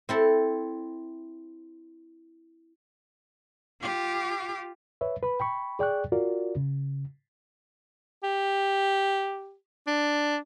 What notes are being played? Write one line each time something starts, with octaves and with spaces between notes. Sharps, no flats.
C4 E4 A4
F4 G4
B4 C#5 E5
B4 B5
G5 B5 C#6
G#4 D5 G5 C#6 F#6
F4 F#4 A#4 D5
C#3
G4
D4